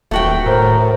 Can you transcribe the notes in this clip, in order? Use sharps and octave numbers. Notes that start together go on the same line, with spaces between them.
D#1 A3 F#4 G5
A2 A#4 C5